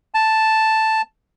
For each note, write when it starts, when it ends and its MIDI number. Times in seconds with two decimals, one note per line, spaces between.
0.14 1.01 81